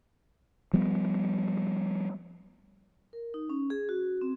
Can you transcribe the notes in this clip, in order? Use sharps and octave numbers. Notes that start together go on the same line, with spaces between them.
F3 G3 B3
A#4
D#4
C#4
G#4
F#4
C4